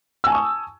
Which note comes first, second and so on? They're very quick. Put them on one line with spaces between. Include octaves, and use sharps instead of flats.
E6 G#5 A5 C#6 D#6